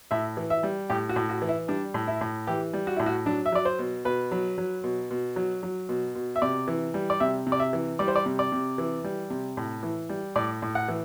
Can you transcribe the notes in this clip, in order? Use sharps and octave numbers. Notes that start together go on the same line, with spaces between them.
A2 E5
E3
E5
G3
A2 G4
F#4
A2
F#4
E3
E4
G3 D4
A2
E4
A2
E3 G4
G3
F#4
A2 E4
F#4
F#3 D4
E5
F#3 D5
C5
B2
B2 B4
F#3
F#3
B2
B2
F#3
F#3
B2
B2
E5
C3 D5
E3
G3
D5
C3 E5
C3
D5
E5
E3
G3 D5
C5
D5
C3
D5
C3
E3
G3
C3
A2
E3
G3
A2 D5
A2
F#5
E3